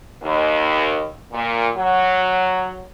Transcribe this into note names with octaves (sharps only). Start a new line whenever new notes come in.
D#2
A#2
F#3